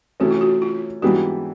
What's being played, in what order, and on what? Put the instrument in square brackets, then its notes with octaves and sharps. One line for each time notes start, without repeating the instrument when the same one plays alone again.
[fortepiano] C3 E3 A3 C#4 [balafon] F#4
[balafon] F4
F#4
F4
[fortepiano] G#2 E3 G3 B3 D4 [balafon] F#4